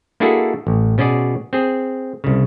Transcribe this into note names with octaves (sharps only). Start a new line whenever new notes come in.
A#3 D4 E4 F#4 G#4 A4
A1
B2 C#4 F#4 G#4 D5
C4 G#4
C2 C#3